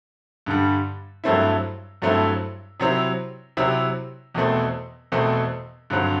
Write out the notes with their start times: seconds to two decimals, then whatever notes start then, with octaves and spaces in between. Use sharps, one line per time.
0.46 G2 D3 G3
1.24 G2 F#3 A3 C4 E4
2.02 G2 F#3 A3 C4 E4
2.80 C3 F#3 C4 E4
3.57 C3 F#3 C4 E4
4.35 E2 B2 A3 C4
5.12 E2 B2 A3 C4
5.90 G2 D3 F#3 C4